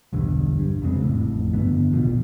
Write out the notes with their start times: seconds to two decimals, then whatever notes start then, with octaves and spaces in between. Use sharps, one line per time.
0.13 B1 E2 G2 D3
0.59 G2
0.82 F2 C#3 G#3 C4
1.02 A1 F2 A2
1.53 G#1 G2 D3 B3
1.93 E1 A#1 B2 F3